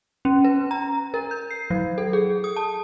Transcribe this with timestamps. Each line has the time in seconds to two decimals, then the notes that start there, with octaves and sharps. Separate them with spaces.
0.25 C#4
0.44 B4
0.71 A#5
1.14 A#4
1.31 G6
1.51 C7
1.70 F#3
1.98 A4
2.13 G#4
2.44 D#6
2.56 A5